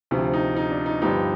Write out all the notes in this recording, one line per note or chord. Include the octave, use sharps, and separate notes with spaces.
D2 C3 F3
D#4
D#4
D4
D#4
G1 G2 F3 D#4 G4